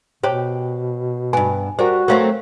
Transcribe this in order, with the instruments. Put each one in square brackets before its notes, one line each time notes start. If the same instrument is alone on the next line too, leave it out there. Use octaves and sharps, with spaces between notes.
[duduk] B2 [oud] G4 [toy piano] C5 C#5
[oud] G2 B3 [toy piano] G#5
[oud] G3 A#4 [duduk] F#4 [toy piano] C5
[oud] F#3 A3 C4 [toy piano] A#4 C#5 F5